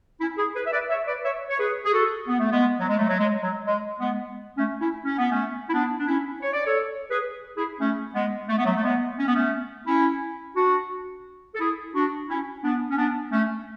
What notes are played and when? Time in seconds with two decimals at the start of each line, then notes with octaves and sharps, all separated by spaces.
0.21 C#4 E4
0.38 E4 G#4
0.55 G#4 B4
0.67 E5
0.73 B4 D5
0.90 C#5 E5
1.08 B4 D5
1.24 C#5 E5
1.49 C#5
1.59 G#4 B4
1.85 G#4
1.93 F#4 A4
2.28 B3
2.40 A3
2.51 G#3 B3
2.80 F#3
2.89 G#3
2.98 F#3 A3
3.09 F#3
3.20 G#3
3.43 F#3
3.67 G#3
4.00 G#3 B3
4.58 A3 C#4
4.81 C#4 E4
5.05 C#4
5.18 B3
5.31 A3 C#4
5.69 E4
5.73 B3 D4
5.99 D4
6.07 C#4 E4
6.42 C#5
6.54 D5
6.66 A4 C#5
7.11 G#4 B4
7.57 E4 G#4
7.80 A3 C#4
8.14 G#3 B3
8.49 A3
8.58 B3
8.66 F#3 A3
8.76 A3
8.83 G#3 B3
9.19 C#4
9.27 B3
9.35 A3 C#4
9.87 C#4 E4
10.56 D4 F#4
11.55 A4
11.60 E4 G#4
11.95 D4 F#4
12.29 C#4 E4
12.63 B3 D4
12.91 C#4
12.97 B3 D4
13.32 A3 C#4